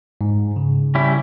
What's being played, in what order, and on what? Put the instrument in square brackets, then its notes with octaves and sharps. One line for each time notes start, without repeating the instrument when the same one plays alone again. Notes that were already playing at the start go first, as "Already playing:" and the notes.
[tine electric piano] G#2
C#3
[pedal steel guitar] G3 C#4 E4